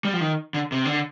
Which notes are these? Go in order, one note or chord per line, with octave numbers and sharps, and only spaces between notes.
G3
F3
D#3
D3
C3
D3